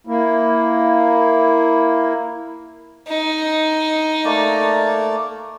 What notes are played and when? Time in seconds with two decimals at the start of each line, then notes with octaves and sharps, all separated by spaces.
0.07 A#3 E4
3.08 D#4
4.25 A3 A#3 D5